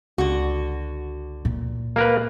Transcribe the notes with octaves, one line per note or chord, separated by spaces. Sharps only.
C#2 D3 F#4
A#2
A#3 A#4 B4